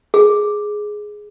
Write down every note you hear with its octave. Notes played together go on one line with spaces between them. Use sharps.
G#4